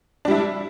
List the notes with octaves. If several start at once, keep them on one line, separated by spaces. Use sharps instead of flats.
G3 D4 E4